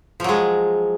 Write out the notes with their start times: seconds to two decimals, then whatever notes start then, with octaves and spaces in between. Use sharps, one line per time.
0.20 F3
0.24 F#3
0.29 G#3